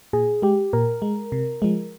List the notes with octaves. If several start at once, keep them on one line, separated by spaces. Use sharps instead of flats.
A#2 G#4
G#3 G4
A#2 A#4
G#3
C3
F3 G#3